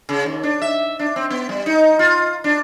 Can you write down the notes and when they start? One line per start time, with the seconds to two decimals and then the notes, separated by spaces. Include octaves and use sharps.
0.09 C#3
0.26 D#2
0.43 D4
0.62 E5
0.99 D4
1.16 C4
1.30 B3
1.49 G3
1.66 D#4
1.99 F4
2.44 D4